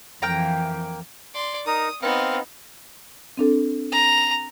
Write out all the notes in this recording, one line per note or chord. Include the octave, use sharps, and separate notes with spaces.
F2 E3 A#3 G5 A#5
D5 C6
D#4 A#4 D#6
B3 C4 D#4 F5
C4 D4 A4
A#5